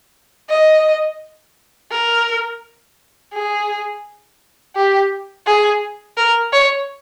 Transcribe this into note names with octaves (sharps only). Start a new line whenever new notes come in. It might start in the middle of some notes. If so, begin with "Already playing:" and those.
D#5
A#4
G#4
G4
G#4
A#4
C#5